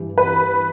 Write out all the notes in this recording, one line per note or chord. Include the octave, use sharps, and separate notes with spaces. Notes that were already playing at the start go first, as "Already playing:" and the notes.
Already playing: G2 E3
B4